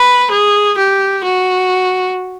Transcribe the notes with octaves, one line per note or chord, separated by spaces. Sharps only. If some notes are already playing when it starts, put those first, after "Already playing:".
Already playing: B4
G#4
G4
F#4